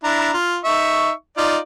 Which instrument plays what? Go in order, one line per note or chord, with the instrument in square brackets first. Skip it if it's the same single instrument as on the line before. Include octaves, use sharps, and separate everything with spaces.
[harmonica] D4 E4 A#5
F4
D#4 E5 C#6
D#4 F4 D5